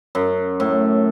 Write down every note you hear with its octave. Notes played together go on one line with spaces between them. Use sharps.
F#2
A2